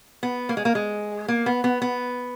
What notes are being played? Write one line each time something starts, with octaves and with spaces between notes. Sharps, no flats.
B3
A#3
G#3
A#3
G#3
A#3
B3
B3
B3